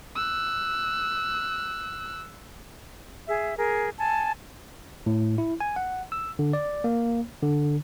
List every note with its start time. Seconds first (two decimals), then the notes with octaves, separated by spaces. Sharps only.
0.15 E6 F#6
3.28 G#4 E5
3.58 G#4 A#4
3.99 G#5 A5
5.06 A2
5.38 E4
5.60 G#5
5.76 F#5
6.12 E6
6.39 D3
6.53 D5
6.84 A#3
7.42 D3